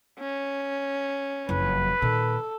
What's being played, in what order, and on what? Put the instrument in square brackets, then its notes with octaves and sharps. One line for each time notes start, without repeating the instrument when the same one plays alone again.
[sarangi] C#4
[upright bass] F#1 F2 [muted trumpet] B4
[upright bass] A#2 D#3 [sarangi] A4